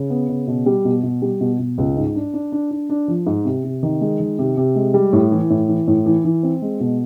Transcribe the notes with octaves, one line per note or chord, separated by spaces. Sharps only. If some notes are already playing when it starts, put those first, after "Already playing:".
Already playing: C#3
B3
C#3
B2
G3
B2
B2
G3
B2
B2
C#2
G#2
D4
D4
D4
D4
D4
F3
G#2
C3
C3
D#3
G#3
D#3
C3
C3
G#3
G3
A2
E3
A2
E3
A2
E3
E3
C4
G#3
B2